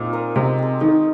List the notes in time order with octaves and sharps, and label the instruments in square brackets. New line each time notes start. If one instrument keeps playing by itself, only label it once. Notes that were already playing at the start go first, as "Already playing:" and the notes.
Already playing: [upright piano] A#2 [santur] A#3 C4 D#4 F4 G#4 C5
[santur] A#4 D#5
[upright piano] C3 [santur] G#3
[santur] C4 G#4
[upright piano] D#3 [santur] D#4